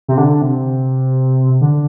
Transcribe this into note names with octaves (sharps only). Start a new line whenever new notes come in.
C3
D3
C3
D3